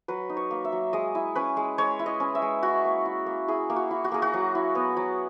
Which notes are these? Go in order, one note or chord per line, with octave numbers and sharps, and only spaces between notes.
F#3 B4
D#4
C#5
A#3
E5
F#3
G#3 D#5
E4
C#4 B4
G#3
G#3 C#5
E4
D#5
C#4
E5
G#3
E4 F#4
A#3
E4
A#3
E4 G#4
A#3
F#4
E4
F#4
A#3 G#4
F#4
F#3
E4
B3
F#3